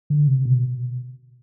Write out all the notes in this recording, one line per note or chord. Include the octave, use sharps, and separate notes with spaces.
D3
C3
B2